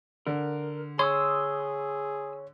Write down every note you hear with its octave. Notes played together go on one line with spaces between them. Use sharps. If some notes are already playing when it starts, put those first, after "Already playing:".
D3 A#4
G#4 C#5 C6 D#6 E6